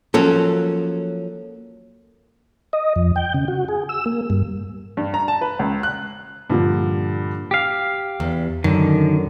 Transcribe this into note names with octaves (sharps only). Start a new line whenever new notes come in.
F3 F#3 A#3 C#4 A4
D#5
F2
G5
C#3
F#4
G#4
E6
A#3
G2
G2
A#5
A5
B4
C#2
F#6
G2 A#2 D3 F3
G4 F5
E2
F#2 D3 D#3